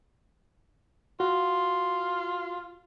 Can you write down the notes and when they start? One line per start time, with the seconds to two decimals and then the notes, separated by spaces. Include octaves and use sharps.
1.20 F4 F#4